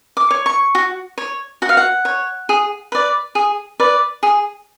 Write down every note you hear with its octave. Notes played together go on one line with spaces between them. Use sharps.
D6
C#5
C#6
F#4
C#5
F#4 F#5
F5
F#5
C#5
G#4
B4 D5
G#4
B4 D5
G#4